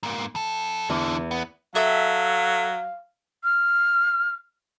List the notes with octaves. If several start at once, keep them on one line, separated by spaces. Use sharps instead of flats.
G#2 A#3
F2 A4
E2 D3 E3
B3
F#3 A4 E5 F5 E6
F6